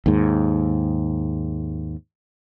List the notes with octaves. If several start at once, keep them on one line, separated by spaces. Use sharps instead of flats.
D#2 G#2